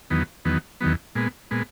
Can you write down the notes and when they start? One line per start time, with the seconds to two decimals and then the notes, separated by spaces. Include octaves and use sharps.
0.10 E2 D#3 F#3 B3
0.45 E2 D#3 F#3 B3
0.81 E2 D#3 F#3 B3
1.15 A#2 G#3 B3
1.51 A#2 G#3 B3